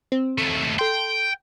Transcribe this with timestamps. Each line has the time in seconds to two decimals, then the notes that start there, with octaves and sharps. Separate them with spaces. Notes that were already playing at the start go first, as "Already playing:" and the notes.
0.12 C4
0.38 D#2 A3
0.79 A4 G5 C6